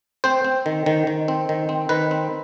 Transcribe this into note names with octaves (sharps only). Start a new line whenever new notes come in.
C4 C5
C4
D#3
D#3
D#3
C4
D#3
C4
D#3 B4
C4